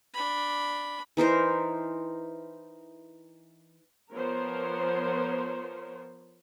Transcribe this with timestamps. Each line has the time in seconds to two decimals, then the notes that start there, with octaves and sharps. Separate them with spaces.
0.13 D4 B5
1.17 E3 D#4 A#4 C5
4.13 F3 B3 A#4 C5 C#5